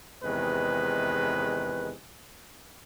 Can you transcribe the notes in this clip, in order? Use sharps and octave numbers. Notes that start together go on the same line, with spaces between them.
E2 C3 D#3 G#3 B4